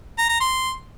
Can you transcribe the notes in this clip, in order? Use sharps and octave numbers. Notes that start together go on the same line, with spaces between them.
A#5
A#5
C6